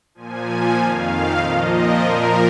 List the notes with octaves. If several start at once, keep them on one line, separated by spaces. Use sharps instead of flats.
A#2 F3 G#5
F2 D#3 F5
A#2 F3 D#5
A#4
A#2 F3